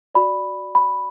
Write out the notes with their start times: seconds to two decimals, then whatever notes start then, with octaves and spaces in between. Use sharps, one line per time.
0.15 F#4 D5 B5
0.75 B5